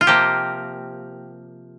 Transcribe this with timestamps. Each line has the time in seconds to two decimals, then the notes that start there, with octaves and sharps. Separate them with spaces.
0.01 F4
0.07 C3 F3 A#3 G4